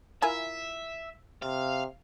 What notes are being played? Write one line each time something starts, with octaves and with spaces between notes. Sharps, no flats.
E4 F4 A#4 E5 G#5
C3 F5